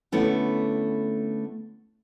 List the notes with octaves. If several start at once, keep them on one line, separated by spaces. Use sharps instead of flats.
D3 A3 B3 C#4 E4